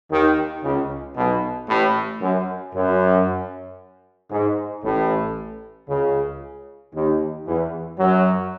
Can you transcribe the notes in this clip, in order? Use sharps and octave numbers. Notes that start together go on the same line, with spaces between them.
D#2 D#3
C#2 C#3
B1 B2
A1 A2
F#2
F#2
G#2
A1 A2
C#2 C#3
D#2 D#3
E2 E3
F#2 F#3